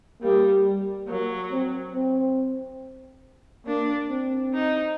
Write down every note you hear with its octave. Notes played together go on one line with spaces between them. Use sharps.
G3 A#3
G3
F#3 A#3
C4
C4
A#3 D4
C4
D#4